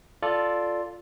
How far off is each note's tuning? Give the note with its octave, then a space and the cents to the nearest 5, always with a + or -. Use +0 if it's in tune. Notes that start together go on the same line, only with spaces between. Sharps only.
F4 +0 A4 +0 D5 +0